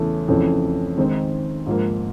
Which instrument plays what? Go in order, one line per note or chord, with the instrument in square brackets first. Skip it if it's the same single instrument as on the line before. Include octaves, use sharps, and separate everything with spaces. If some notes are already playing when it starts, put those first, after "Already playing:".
Already playing: [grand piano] E2 C#3 E3 A3
F2 C#3 E3 A3
D#3 G#3 C4 D#4
G#2 F3 A#3